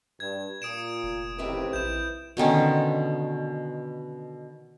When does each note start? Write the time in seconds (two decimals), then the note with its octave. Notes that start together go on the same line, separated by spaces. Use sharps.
0.20 G2 G#6
0.62 A#2 D#6 D7 E7
1.03 F1
1.38 A1 C3 D#3 C4 E4 B4
1.73 A#1 G6 E7
2.37 B2 D3 D#3 C#4